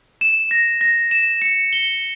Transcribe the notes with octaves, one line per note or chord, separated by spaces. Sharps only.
E7
A#6
A#6
E7
C#7
G7